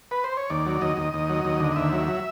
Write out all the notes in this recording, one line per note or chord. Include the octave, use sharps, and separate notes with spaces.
B4
C5
C#5
D#2 D5
F#3
D#2 D#5
D#2
D#2
F#3
D#2
D3
D#5
D#2 E5
F#3
F#3